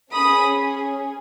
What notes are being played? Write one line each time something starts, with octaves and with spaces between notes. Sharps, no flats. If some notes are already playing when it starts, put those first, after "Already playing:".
C#4 G#4 B5 D#6